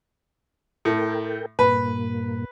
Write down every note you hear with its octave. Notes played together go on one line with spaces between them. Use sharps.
A2 A4 A#4 G5
G2 A#2 A#3 B4